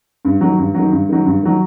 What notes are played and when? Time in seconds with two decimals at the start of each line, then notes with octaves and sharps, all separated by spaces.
0.25 G2
0.41 D#3 F#3
0.58 G2
0.74 D#3 F#3
0.91 G2
1.09 D#3 F#3
1.26 G2
1.43 D#3 F#3